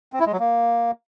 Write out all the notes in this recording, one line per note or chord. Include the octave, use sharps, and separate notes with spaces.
C4
E4
G#3
F#3
A#3